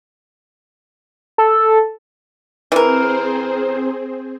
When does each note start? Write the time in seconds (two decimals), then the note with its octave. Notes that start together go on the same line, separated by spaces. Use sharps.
1.38 A4
2.72 E3 C4 G#4 A#4 C5